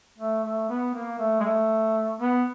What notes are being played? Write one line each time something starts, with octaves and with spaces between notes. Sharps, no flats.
A3
A3
B3
A#3
A3
G#3
A3
B3